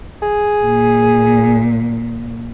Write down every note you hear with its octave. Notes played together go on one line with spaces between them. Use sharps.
G#4
A#2